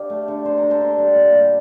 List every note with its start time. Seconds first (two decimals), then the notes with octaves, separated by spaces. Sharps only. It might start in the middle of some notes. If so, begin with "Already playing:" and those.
Already playing: D3 G4 D5 F5
0.10 A3
0.28 D3
0.45 D3 C5
0.58 A#4
0.63 D3
0.70 A4 C5
0.80 D3
0.98 G3
1.15 A#2
1.33 G3